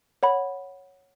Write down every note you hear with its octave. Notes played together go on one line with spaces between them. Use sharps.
C#5 F#5 B5